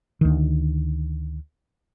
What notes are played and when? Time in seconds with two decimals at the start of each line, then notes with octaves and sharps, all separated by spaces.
0.21 D2 D#3